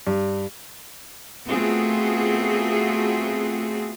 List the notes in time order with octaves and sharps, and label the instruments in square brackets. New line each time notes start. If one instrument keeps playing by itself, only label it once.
[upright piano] G2
[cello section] A3 B3 C4 F4 F#4 G#4